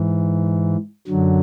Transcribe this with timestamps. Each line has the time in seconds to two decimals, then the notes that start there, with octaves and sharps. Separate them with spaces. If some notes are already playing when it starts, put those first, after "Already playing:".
Already playing: G#2 E3
1.07 F#2 D3 F#3